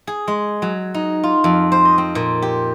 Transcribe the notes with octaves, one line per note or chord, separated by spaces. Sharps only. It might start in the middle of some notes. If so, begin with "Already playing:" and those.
G#4
G#3
F#3
D#4
F4
F2
C5
D#5
C4
A#2
G4